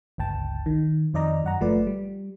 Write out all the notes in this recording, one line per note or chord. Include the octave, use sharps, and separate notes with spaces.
G1 C#2 G5 A5
D#3
F2 D#3 D5 D#5 A#5
F#2 F#5 A#5
G1 F3 A3 B4 D5
G3